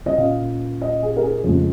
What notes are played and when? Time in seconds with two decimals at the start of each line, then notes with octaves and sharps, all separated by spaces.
0.06 D#5
0.18 A#2 A#3 C#4 F5
0.81 D#5
1.03 G#4
1.17 A#4
1.23 G#4
1.44 F2 C#3 G#3